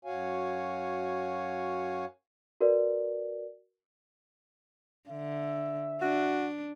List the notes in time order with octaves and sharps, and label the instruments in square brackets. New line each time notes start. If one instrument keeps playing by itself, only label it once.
[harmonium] F#2 F#4 C#5 F5 G#5
[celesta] F#4 A#4 B4 D5
[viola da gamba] D3 [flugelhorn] E5
[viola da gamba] D4 [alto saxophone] F#4